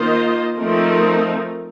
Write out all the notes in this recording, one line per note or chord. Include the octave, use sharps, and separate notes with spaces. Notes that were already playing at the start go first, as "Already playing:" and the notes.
Already playing: D#3 A#3 F4 C5 D#5
F3 A3 C4 D#4 A#4